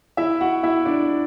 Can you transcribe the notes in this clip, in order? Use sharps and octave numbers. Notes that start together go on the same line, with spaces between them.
E4 E5
F#4 F#5
E4 E5
D4 D5